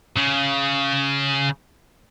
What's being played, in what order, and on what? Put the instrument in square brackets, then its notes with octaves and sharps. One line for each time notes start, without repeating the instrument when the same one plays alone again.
[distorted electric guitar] C#3